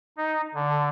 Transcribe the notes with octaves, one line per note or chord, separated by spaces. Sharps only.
D#4
D3